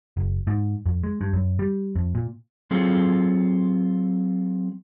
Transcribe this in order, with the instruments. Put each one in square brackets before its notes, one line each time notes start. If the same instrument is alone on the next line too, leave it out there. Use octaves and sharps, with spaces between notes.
[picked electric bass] F#1
G#2
F2
G#3
G2
F#2
G3
F2
A#2
[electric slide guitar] F#3 C4 F4 G#4 A4